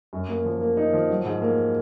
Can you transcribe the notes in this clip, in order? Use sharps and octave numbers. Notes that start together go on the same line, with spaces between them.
F#2
A#3
F3
A#3
D#4
F3
F#3
G#2
A#3